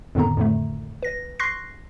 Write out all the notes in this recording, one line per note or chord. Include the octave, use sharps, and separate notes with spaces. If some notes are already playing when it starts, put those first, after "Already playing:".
F2 A2 D3 D#3 B3 A#5
F2 A2 D3 A3
B4 A#6
C6 C#6 F#6 A#6 C7